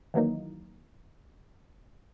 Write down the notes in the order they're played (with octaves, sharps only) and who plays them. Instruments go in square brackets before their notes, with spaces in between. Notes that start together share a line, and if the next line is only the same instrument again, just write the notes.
[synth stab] D#3 E3 F#3 A#3 D#4